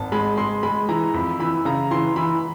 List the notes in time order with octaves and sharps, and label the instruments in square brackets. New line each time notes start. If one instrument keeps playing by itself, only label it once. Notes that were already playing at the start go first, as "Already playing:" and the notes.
Already playing: [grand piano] G#1 [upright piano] A5
[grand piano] G#3 [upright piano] B5
[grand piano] G#3 [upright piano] C6
[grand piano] G#3 [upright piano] B5
[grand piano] E3 [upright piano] A#5
[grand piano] F2 [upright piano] B5
[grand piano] E3 [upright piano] B5
[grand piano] C#3 [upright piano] A#5
[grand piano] E3 [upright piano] C6
[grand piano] E3 [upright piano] B5